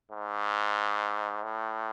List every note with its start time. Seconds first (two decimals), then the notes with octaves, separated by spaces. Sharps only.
0.11 G#2
1.43 A2